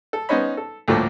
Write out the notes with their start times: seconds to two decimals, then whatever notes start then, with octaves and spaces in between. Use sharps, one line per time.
0.13 A4
0.29 B3 C#4 D#4 C5 C#5 B5
0.57 A4
0.88 D2 A2 D3 F3 A3 A#3